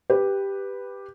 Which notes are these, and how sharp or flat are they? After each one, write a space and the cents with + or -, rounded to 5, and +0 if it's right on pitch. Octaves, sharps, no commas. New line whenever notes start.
G4 +5 B4 +0